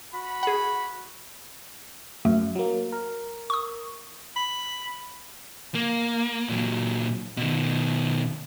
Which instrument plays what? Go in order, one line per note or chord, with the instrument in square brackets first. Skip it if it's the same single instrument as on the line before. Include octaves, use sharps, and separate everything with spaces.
[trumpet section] F#4 B5
[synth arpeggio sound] G#4 F#5
[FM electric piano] F#2 [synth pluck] A3
[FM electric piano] F#3 A#3
A#4
[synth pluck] C#6 D#6
[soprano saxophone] B5
[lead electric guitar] A#3
A#2 F#3
B2 D#3